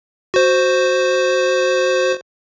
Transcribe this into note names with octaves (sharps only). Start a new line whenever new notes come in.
F#4 C5